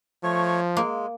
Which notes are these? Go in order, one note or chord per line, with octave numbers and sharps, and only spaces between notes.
F3 A3 C#5 C#6
G#3 A#3